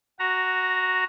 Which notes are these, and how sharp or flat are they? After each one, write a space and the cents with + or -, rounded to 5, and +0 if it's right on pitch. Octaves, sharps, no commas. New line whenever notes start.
F#4 +0 A#5 +0